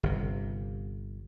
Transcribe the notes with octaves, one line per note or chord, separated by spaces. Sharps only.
G1 C3